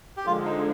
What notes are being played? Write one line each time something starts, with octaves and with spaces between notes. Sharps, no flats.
G4
D3 F3 G#3 F4
D#4